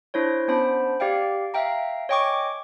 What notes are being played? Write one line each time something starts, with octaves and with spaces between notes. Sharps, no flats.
D4 E4 C5 C#5
B3 C#4 D4 C5 A5 B5
G4 D5 F5 G5
E5 F5 G5 A#5
C#5 D#5 G5 G#5 C#6 D6